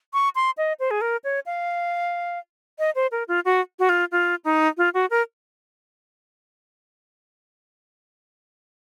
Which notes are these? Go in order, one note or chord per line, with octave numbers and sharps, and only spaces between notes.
C#6
C6
D#5
C5
G#4
A#4
C#5
F5
D#5
C5
A#4
F4
F#4
F#4
F4
F4
D#4
F4
F#4
A#4